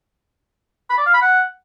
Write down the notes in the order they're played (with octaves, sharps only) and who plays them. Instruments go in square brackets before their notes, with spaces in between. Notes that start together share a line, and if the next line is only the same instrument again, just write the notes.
[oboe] B5
D5
F5
B5
F#5